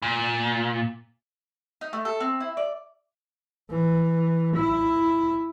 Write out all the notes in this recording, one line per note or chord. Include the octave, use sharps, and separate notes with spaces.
A#2
D#4
A3
A4
C4
E4
D5
E3
E4